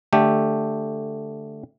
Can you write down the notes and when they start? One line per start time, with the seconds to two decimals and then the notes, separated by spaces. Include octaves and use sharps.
0.13 D3 A3 G4